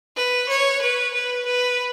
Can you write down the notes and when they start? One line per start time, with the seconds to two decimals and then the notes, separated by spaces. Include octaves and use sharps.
0.16 B4
0.49 C#5
0.82 B4
1.14 B4
1.46 B4